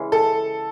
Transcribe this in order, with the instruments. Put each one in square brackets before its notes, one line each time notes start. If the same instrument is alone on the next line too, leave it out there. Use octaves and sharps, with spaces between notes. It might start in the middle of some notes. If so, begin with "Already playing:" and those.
Already playing: [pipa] C#3 E3 G#3
[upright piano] A4